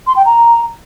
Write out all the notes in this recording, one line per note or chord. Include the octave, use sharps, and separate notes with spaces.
C6
G5
A#5